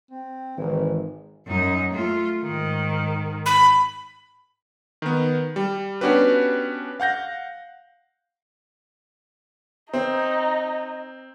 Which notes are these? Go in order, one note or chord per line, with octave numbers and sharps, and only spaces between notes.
C4
G#1 E3
F#2 D#4
A3 F4
G#2 D#3
B5
D#3 B3
G3
B3 C#4 D4 F#4 G4 B4
F5 F#5 G6 A#6
C4 D#4